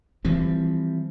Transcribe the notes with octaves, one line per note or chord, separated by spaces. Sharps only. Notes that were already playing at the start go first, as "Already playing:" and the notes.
E3 F3 G3 C4